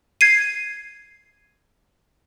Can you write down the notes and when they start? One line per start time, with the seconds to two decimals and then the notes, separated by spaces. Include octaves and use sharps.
0.21 G#6 C7 D#7